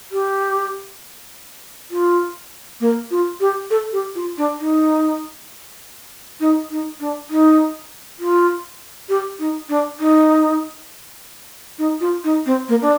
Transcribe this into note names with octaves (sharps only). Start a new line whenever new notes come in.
G4
F4
A#3
F4
G4
A4
G4
F4
D4
D#4
D#4
D#4
D4
D#4
F4
G4
D#4
D4
D#4
D#4
F4
D#4
C4
A#3
D4